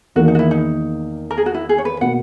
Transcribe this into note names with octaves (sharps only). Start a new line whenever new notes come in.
E2 D#3 A#3 F#4
D#4
F#4
E4
D#4
A#4
G#4
F#4
E4
G#4
C#5
B4
B2 A#3 F#5